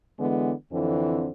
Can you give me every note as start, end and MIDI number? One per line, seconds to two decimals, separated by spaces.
0.19 0.52 50
0.19 0.52 52
0.19 0.52 56
0.19 0.52 59
0.72 1.29 41
0.72 1.29 50
0.72 1.29 52
0.72 1.29 60